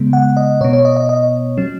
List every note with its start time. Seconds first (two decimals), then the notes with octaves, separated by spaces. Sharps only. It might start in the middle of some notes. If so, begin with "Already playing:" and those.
Already playing: C#3 G#3 B3
0.13 F#5
0.37 D#5
0.61 B2 B3 C#5
0.73 C#5
0.85 D#5
0.97 D#5
1.09 D#5
1.58 F#3 C#4